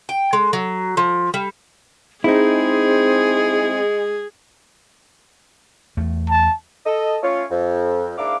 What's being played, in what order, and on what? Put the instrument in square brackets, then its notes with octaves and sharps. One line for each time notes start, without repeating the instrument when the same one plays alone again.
[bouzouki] G5
G#3
F#3
F3
G3
[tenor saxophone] G#3 [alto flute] C4 [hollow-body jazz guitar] D#4 E4 [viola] G#4
[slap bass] E2 A3
[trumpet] A5
[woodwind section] A4 D#5
A3 C#4 F4 C#5
F2
G#2 A#3 D4 E4 F5 D6